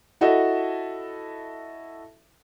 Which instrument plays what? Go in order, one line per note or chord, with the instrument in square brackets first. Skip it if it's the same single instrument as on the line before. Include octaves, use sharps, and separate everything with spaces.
[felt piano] E4 F#4 A4 D#5 E5